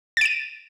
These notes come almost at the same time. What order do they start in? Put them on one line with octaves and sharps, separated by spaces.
A6 D7 D#7